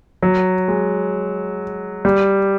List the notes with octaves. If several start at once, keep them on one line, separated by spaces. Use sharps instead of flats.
F#3
G#3
G3